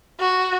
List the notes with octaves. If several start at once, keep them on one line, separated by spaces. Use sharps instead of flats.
F#4